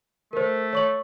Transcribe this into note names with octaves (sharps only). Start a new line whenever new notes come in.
A3 A#4 C5
C#5 C#6 F#7